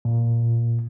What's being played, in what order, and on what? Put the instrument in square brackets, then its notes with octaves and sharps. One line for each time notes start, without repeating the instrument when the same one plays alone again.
[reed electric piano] A#2